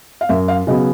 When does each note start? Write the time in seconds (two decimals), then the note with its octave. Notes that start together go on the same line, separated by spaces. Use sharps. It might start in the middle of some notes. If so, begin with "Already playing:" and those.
0.21 F5
0.29 F#2 E5
0.48 F5
0.67 C#3 F#3 B3 D#5